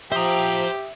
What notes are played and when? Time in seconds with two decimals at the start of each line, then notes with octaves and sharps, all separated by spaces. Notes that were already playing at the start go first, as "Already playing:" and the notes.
0.12 F3 G4 C5 E5 G5 A#5 D#6